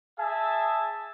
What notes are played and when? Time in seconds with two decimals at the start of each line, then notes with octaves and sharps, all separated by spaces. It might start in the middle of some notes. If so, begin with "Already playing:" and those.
0.19 G#4 E5 G#5 A5